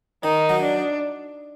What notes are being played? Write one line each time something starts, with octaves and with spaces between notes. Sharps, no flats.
D#3 D#4
F#3
D4